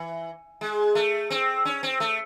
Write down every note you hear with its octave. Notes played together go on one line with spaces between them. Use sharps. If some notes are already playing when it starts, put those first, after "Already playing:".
Already playing: E3
G#3
A3
C4
C#4
C4
A3